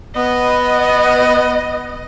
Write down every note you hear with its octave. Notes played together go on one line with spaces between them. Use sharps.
B3 D#5